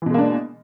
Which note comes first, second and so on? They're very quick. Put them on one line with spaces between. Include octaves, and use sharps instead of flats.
E3 B2 G#3 A#3 D4